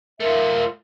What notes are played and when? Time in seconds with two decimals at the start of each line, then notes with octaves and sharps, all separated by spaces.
0.20 A3 F4 A#4 E5